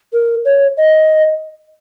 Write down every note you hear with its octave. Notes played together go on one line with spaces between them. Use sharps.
A#4
C#5
D#5